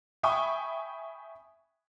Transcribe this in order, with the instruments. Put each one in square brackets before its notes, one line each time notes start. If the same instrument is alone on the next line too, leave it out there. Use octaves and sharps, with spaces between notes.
[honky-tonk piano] E5 G5 G#5 B5 C#6 D#6